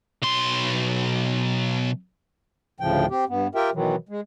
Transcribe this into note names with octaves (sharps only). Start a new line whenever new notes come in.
B1 C6
D2 A2 C#3 F3 G5
C4 G4
G2 B3
F4 G4 A#4 E5 G5
B2 D#3 E3 F#3
G#3